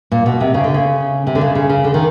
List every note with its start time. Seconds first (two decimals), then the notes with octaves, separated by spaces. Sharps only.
0.12 A#2
0.26 B2
0.41 C3
0.54 C#3
0.64 D3
0.74 C#3
1.27 C3
1.35 D3
1.41 C#3
1.55 C#3
1.69 C#3
1.84 D3
1.94 D#3